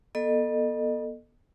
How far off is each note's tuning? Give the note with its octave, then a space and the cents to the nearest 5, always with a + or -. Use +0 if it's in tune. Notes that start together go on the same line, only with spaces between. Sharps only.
B3 -35 A4 +10 D#5 -30